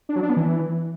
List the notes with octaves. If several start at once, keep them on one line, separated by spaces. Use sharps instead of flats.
D4
F#3
D4
B3
E3